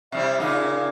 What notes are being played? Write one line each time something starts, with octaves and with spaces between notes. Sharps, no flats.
C3 G3 E4 E5
A#2 C#3 D#4